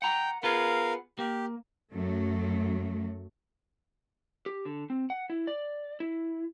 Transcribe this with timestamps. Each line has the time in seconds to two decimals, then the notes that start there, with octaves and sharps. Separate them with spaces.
0.02 F#5 G5 A#5
0.43 B3 F4 G#4 A#4 F5
1.19 A#3 G4
1.93 F#2 F#3 A3
4.46 G4
4.65 D3
4.90 C4
5.10 F#5
5.30 E4
5.47 D5
6.00 E4